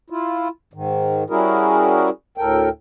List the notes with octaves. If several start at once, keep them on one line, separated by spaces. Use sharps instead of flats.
E4 F4
G#2 D#3
G3 C#4 E4 F#4 G#4 A#4
D2 A2 A4 A#4 G5